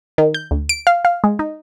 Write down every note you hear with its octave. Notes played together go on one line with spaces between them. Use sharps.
D#3
G6
D2
D7
F5
F5
G#3
D#4